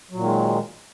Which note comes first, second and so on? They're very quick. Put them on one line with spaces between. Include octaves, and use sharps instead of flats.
F#3 A#2 D#3 G#3